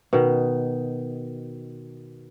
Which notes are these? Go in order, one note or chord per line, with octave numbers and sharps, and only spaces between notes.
B2 D#3